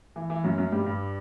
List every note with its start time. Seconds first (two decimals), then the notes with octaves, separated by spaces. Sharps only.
0.16 E3
0.30 E3
0.44 F#2 F#3
0.58 F#2 F#3
0.72 G2 G3
0.86 G2 G3